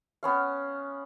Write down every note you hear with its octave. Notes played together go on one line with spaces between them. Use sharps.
B3 C#4 F5